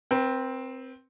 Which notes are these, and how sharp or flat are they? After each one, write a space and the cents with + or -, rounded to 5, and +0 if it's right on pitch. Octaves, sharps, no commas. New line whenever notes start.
C4 +0 B4 -40